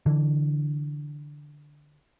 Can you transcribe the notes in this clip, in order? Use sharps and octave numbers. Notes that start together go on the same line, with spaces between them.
D3 E3